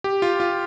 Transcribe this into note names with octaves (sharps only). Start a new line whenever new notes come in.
G4
F4
F4